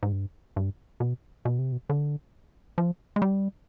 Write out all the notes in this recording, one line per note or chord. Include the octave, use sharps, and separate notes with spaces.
G#2
G2
G2
B2
B2
C3
B2
D3
F3
G#3
G3